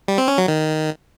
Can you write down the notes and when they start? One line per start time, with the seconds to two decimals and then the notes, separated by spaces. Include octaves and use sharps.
0.08 G3
0.18 C4
0.28 C#4
0.38 F#3
0.48 D#3